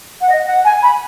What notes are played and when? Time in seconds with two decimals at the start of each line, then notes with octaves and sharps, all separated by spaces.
0.21 F#5
0.29 D#5
0.47 F#5
0.65 G#5
0.82 B5